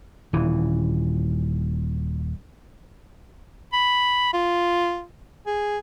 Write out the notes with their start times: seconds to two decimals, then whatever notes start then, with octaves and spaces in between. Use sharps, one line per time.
0.33 D#1 E3
3.73 B5
4.34 F4
5.47 G#4